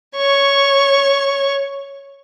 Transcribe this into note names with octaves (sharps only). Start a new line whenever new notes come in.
C#5 C#6